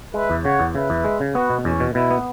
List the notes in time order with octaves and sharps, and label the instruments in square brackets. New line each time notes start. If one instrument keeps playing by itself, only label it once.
[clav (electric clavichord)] G#3 [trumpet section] B4 E5
[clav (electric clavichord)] E2
[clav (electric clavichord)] C#3 [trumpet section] C#5 F#5
[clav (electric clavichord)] E2
[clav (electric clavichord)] C#3 [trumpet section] B4 E5
[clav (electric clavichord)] E2
G#3
C#3
[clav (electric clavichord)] B3 [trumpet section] F#4 B4
[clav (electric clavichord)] B2
[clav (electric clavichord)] E2 [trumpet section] C#4
[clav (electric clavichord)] B2
[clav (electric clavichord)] B2 [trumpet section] E4
[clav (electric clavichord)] B3